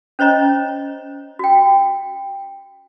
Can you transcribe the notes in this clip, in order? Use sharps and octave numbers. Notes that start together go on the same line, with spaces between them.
C#4 C5 C#5 D#5 A#5
F#4 G5